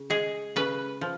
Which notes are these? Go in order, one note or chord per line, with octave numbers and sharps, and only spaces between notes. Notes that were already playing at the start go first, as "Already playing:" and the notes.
Already playing: C#3
G#3 G#4
C#3 B4
F3